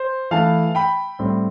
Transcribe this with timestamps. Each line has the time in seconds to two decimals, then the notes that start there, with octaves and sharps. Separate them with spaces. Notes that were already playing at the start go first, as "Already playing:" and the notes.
Already playing: C5
0.31 E3 A3 E4 F5 A5
0.75 G5 B5
1.19 A2 G3 C4